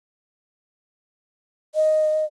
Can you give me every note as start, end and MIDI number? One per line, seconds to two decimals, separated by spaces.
1.75 2.25 75